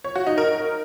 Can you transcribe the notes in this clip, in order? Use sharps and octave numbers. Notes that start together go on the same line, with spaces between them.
C#5
F#4
D#4
A#4